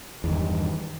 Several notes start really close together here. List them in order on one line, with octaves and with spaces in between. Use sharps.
E2 D#3 G2